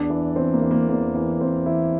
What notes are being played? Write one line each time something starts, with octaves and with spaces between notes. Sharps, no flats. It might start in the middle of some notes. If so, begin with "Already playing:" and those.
Already playing: E2 D4
E3
E2 C4
A#3
E3
A#3
E2 A#3
E3
E2 C4
E3 E4